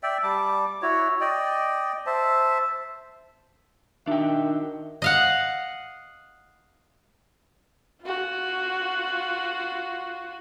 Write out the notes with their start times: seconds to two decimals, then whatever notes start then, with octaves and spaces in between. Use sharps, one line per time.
0.03 D5 E5 G5
0.23 G3 A5 D6
0.82 E4 F#4 C#5
1.21 D5 D#5 G5
2.06 C5 E5 A5
4.07 D#3 D4 F#4 E5 G5
5.02 D#5 F5 F#5
8.02 F4 F#4